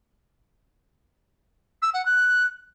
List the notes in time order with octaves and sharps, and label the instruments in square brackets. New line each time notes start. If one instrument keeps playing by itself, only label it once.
[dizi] E6
F#5
F#6